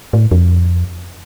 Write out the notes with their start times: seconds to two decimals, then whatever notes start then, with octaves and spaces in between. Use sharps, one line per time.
0.13 A2
0.31 F2